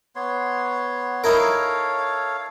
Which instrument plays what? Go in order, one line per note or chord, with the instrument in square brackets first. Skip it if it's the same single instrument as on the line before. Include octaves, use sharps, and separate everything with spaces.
[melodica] B3 C#5 C6
[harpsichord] D#4 E4 A#4 [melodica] A4 C#5 F5